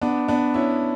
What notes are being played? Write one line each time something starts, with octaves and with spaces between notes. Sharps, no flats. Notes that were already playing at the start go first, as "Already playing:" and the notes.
B3 D4
B3 D4
C#4 E4